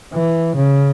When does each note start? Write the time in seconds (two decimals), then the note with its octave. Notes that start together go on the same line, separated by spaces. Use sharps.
0.13 E3
0.57 C#3